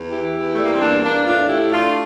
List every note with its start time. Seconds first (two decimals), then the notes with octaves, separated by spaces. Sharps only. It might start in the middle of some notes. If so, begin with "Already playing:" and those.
Already playing: E2
0.12 E3 E4 G4
0.35 E2
0.54 G3 A3
0.63 A#3
0.72 C4
0.80 E2 A#3 D4
1.03 E2 A#3 D4
1.26 A2 D4 F4
1.49 A3 E4 G4
1.72 A3 D4 F4